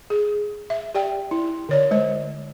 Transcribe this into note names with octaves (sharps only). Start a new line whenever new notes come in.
G#4
E5
G4 D5 G5
E4
D3 C#5 D5
G#3 C5